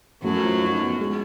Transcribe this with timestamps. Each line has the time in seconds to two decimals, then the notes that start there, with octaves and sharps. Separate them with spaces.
0.24 F#2 F#3 A3
0.43 F3
0.62 D#4
0.81 B3
1.00 G#3